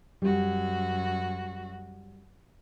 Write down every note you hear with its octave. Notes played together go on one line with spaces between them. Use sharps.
F#2 G3 F#4